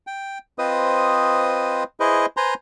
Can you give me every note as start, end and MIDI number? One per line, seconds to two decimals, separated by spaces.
0.07 0.38 79
0.58 1.84 60
0.58 1.84 65
0.58 1.84 71
0.58 1.84 72
0.58 1.84 75
0.58 1.84 87
2.00 2.26 64
2.00 2.26 68
2.00 2.26 71
2.00 2.26 72
2.00 2.26 75
2.37 2.54 71
2.37 2.54 72
2.37 2.54 80
2.37 2.54 82
2.37 2.54 84